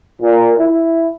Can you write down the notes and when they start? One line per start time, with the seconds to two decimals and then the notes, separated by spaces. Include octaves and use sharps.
0.21 A#2
0.59 E4